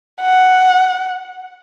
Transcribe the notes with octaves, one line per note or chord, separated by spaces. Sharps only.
F#5